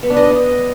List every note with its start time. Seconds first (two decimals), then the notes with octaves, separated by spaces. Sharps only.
0.03 B3
0.10 D4
0.17 D#5